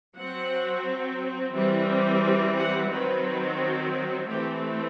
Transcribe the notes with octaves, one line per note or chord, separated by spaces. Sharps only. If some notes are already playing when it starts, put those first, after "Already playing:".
F#3 C4 F#5
E3 G3 C4
F#5
D#3 F#3 C4 B4
E3 A3 C4 G4